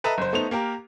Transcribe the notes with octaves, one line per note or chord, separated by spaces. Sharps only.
A4 B4 D#5 E5 A5 A#5
F#1 C5
A3 B3 D#4 C5 F7
A#3 G4 A#4